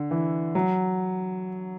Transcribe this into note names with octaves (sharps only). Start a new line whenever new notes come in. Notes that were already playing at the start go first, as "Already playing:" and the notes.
Already playing: D3
E3
F#3